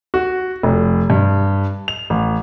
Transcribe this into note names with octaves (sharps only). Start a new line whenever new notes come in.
F#4
F1
G2
F7
A1